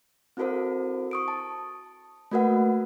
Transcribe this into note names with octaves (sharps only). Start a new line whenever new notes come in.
C4 E4 F#4 A4 A#4 C5
C#6 D#6 D7
A5
A3 A#3 F#4 A#4 B4 F#5